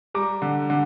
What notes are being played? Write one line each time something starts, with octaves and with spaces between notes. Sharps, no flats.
G3 A#5 D6
D3
D3